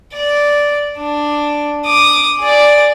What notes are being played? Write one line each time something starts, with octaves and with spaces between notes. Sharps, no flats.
D5
D4
D6 D#6
G#4 D5